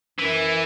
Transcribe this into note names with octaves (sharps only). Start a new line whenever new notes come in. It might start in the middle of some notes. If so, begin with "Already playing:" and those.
F#2 E3